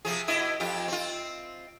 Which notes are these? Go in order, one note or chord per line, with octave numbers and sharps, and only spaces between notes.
C3 F3 G#4
B2 E4 D#5
F2 F4 G4
C4 F4